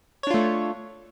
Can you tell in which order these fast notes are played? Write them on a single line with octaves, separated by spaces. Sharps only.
C#5 D4 F4 A3